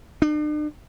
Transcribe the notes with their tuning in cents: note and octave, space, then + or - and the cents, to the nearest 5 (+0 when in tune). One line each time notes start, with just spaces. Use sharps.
D4 +45